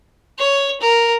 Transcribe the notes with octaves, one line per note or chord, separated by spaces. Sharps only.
C#5
A#4